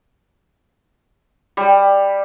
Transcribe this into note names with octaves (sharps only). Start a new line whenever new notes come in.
G3